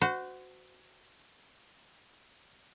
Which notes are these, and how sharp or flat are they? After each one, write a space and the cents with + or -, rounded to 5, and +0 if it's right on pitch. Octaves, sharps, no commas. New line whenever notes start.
F#4 +0 C5 -30